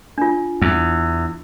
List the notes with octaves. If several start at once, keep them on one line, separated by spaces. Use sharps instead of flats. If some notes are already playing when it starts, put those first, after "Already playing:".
D4 F4
E2